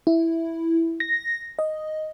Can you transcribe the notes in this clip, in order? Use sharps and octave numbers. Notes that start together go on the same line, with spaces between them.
E4
A#6
D#5